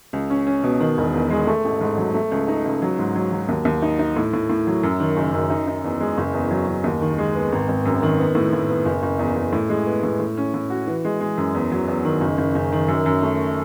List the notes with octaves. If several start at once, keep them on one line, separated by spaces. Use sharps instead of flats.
C#2
C#4
C#4
B2
D#3
E1
E2
G#3
A3
A1
G#2
F#3
A3
C#2
D#4
C#2
F#3
G#2
F#3
F#3
D#2
D#2
D#4
D#4
A2
A2
A2
F#3
F#2
D#3
F#1
F#2
D#4
D#4
E2
G#3
F#1
E2
F#3
F#1
D#2
D#3
G#3
B3
G#1
G#1
F#2
D#3
B3
A2
A2
B3
F#1
F#1
E2
F#1
A2
G#3
B3
A2
A2
C#4
A2
F#4
E3
G#3
G#3
F#2
E2
F#3
E2
D#3
F#1
F#1
F#1
D#3
F#2
F#2
A3